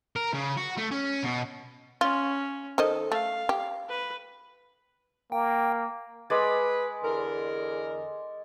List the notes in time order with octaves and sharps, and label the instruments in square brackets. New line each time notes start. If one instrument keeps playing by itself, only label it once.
[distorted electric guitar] A#4
C#3
F#4
A3
C#4
B2
[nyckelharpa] C#4 [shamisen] F4
[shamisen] D#3 C5 D#5 [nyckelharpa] A4
[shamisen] A3 [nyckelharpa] F5
[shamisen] G4
[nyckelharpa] B4
[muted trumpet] A#3 [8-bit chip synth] G5
[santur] G#3 G#4 D5 [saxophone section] B4
[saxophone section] E2 D3 A#4